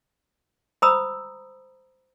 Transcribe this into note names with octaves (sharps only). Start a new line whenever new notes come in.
C5 A#5 B5 D#6 E6